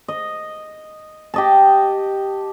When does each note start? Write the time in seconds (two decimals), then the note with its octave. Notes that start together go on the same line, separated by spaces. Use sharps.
0.08 D#5
1.34 G4 D#5 A5